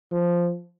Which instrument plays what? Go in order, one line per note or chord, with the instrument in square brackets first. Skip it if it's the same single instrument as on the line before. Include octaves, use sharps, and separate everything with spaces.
[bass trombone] F3